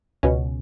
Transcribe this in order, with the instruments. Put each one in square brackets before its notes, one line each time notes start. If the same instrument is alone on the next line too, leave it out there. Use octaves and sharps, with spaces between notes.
[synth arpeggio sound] C#2 B2 C#4